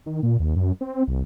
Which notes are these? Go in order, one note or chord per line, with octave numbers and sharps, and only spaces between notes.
D#3
A#2
D#2
F#2
C4
C2